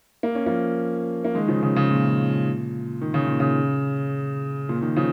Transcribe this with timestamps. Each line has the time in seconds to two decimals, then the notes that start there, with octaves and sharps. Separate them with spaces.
0.23 A#3
0.35 C#4
0.46 F3 A#3
1.25 A#3
1.34 D#3 G#3
1.48 C#3 F3
1.63 C#3
1.76 C#3
1.90 A#2
3.01 D#3
3.14 C#3
3.27 A#2
3.40 C#3
4.69 A#2
4.82 A#2 D#3
4.96 C#3 F3